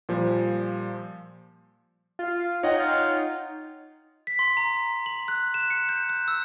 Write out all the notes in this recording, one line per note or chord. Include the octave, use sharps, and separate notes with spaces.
A#2 F3 G3
F4
D#4 C#5 D#5 F#5 G5
F4
B6
C6
A#5
F#7
F#6
E7
C#7
G6
F#6
E6